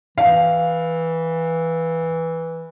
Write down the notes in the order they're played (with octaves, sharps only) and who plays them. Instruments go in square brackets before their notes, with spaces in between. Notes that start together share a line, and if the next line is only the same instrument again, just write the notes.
[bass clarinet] E3 [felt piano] F5